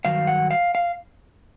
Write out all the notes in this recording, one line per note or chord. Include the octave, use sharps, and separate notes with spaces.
G2 D#3 F#3 F5
F#5
F5
F5